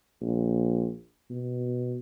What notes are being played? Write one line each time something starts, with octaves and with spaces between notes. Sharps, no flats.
A#1
B2